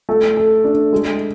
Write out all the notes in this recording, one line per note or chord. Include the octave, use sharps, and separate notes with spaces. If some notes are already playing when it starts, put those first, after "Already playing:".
A3
A4
D4
G#3